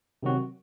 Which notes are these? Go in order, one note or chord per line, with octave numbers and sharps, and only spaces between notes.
C3 D#3 F#3 C4 F#4